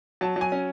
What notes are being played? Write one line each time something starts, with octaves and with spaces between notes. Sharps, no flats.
F#3 A5
F#3 G#5
C#4